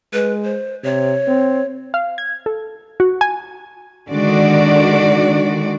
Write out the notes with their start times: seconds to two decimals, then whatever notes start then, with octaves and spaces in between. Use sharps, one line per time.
0.13 G#3 B4
0.44 C5
0.83 C3 C#5
1.27 C4
1.94 F5
2.18 G#6
2.46 A4
3.00 F#4
3.21 G#5
4.09 D3 D#3 G#3 D4 F#4 D5